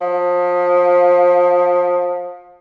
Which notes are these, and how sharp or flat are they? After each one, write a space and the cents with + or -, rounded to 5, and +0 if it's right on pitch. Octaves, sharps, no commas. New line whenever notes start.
F3 +25